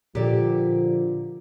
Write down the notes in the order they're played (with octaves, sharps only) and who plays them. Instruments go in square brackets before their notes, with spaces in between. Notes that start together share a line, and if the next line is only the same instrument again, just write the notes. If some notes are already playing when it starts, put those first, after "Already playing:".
[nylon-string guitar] A#2 D5 [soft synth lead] D3 [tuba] F3 [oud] G4